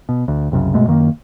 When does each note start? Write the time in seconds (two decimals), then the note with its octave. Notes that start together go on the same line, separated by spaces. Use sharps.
0.09 B2
0.28 D2
0.52 F#1 C2 F#2 C#3
0.74 G1 B2 G#3 A3
0.87 F#2 D#3 A#3